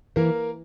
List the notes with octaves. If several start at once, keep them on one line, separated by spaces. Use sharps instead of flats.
E3 A#3 A#4